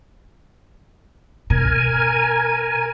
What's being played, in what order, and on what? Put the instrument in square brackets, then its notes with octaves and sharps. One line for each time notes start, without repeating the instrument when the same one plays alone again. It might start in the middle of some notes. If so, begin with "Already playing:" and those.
[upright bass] B2 [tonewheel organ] A#4 G#5